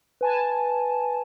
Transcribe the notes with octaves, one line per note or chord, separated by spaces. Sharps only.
B4 G#5 A5